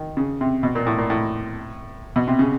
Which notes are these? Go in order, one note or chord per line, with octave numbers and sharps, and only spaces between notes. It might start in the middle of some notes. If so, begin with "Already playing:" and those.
Already playing: D#3
C#3
C3
B2
A#2
A2
A#2
A2
B2
C3
C#3